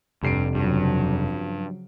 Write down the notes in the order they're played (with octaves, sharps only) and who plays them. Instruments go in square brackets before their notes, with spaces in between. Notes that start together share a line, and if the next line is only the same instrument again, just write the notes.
[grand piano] F1 C7 D7 [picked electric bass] G2
[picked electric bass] G2 [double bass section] C#3 F3 F#3